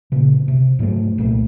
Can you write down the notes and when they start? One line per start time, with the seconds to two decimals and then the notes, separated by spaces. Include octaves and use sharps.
0.12 A#2 C#3
0.48 C3
0.79 G#2 F#3 G3 A3
1.18 C2 A#2 A3